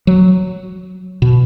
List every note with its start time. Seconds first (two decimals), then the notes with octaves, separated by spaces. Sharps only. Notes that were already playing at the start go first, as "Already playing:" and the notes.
0.07 F#3
1.22 B2